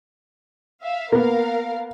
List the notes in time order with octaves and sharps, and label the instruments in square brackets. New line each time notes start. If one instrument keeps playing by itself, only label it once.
[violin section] E5 F5
[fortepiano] A#3 B3 [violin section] A#4 F5